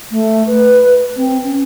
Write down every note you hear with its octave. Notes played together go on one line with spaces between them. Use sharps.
A3
B4
C4
C#4